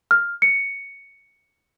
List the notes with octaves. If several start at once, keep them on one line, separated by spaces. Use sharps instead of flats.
F6
C#7